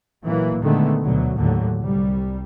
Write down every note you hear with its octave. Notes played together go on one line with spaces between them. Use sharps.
A#2 E3 F#3 A#3
A#2 D3 D#3 G#3 A3 B3
D2 B2 F#3
D#2 A2 D3 F#3
C2 G3